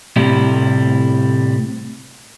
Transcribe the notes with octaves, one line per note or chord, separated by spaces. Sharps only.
A2 C3 G3 E4